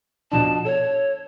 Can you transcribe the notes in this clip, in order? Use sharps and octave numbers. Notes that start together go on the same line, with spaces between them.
B2 F3 D4 A5
A4 C#5